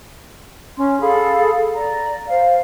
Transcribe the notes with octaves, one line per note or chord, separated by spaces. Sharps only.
C#4 C6
G#4 A4 F5 B5
D5 A#5
C5 F5